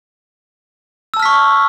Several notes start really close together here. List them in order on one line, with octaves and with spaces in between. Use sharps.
E6 A5 F6 B6 C#6